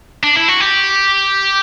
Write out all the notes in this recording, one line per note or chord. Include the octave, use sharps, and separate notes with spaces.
D4
E4
F#4
G4